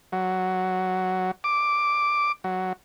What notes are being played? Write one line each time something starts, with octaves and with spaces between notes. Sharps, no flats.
F#3
D6
F#3